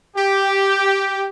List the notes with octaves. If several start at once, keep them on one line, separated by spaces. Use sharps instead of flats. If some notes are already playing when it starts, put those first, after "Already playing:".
G4